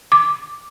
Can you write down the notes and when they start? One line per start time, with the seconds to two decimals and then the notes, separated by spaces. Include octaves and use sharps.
0.12 D6